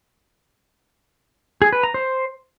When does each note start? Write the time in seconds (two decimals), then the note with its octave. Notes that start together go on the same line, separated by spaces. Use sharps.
1.62 G#4
1.73 B4
1.83 A#5
1.94 C5